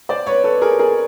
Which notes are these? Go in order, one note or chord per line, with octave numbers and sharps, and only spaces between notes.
C5 D5
B4 C#5
A4 B4
G#4 A#4
G#4 A#4